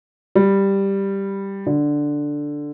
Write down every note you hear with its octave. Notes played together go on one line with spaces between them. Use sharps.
G3
D3